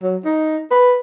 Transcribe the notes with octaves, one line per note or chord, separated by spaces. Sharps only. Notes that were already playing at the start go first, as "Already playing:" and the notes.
F#3
D#4
B4